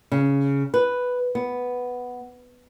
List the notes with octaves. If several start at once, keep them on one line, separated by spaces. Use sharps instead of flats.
C#3
B4
B3